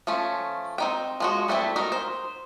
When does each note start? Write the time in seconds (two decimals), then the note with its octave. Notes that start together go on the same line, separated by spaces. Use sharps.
0.07 F3 A3 C#4
0.78 C4 D#4 G5
1.20 F3 G#3 F#4
1.48 G3 A3 C4 E4
1.76 D#4 F#4 A#4
1.92 C5